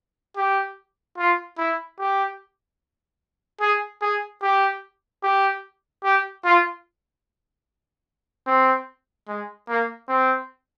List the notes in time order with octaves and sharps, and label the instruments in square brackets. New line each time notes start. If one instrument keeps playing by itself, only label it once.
[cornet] G4
F4
E4
G4
G#4
G#4
G4
G4
G4
F4
C4
G#3
A#3
C4